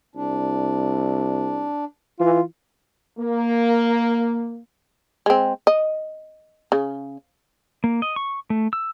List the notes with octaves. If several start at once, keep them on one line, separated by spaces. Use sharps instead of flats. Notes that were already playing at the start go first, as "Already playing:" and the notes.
C2 D4
E3 F4
A#3
G#3 C4
D#5
C#3
A#3
D#5
C#6
A3
E6